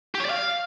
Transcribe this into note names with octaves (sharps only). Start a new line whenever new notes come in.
G4
C#5
D5
F5